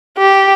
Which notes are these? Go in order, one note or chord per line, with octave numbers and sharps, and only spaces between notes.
G4